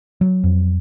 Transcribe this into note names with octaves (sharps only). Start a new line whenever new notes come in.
F#3
F2